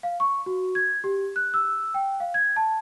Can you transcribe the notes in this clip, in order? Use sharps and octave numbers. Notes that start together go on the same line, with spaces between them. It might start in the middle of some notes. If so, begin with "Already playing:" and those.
F5
C#6
F#4
G#6
G4
F#6
E6
G5
F5
G#6
A5